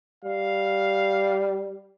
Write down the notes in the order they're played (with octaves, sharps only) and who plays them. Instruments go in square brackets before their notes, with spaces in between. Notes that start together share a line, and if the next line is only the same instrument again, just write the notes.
[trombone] G3 [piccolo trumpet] F5